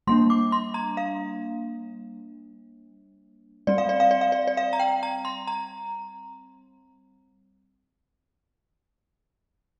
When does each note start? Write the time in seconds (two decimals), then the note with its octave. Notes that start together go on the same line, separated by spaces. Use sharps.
0.07 G3 A#3 D4 C6
0.30 D6
0.52 C6
0.74 A#5
0.97 F5
3.67 G3 C4 D5
3.78 F5
3.89 D5
4.00 F5
4.11 D5
4.21 F5
4.32 D5
4.47 D5
4.57 F5
4.73 A#5
4.80 G5
5.03 A#5
5.25 C6
5.47 A#5